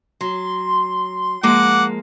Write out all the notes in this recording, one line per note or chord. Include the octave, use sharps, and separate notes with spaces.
F#3 C6
F3 G#3 A#3 F#5 D6